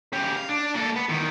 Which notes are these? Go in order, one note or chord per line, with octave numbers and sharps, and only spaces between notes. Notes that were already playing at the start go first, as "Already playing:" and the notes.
C#3 G4
F5
D4
A#3 A4
B3
E2 D#3